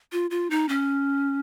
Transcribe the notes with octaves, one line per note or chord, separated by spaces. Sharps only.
F4
F4
D#4
C#4